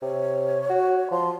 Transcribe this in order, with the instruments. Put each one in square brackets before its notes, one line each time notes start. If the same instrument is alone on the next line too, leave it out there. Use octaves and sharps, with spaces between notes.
[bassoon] C3 [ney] C#5
[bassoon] F#4
[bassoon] F3 [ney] C6